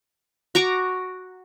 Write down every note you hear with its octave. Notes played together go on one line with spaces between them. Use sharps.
F#4 A#5 C#6 D6